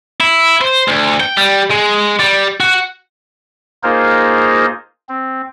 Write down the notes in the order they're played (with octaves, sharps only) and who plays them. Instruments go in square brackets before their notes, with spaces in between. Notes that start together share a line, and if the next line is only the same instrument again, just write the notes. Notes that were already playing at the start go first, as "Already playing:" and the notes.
[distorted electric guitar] E4
C5
D2
G5
G3
G#3
G3
F#4
[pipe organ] A#3 D#4 F4 G#4 A#4 C5
C4